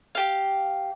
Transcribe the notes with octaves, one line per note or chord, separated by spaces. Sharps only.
G4 F5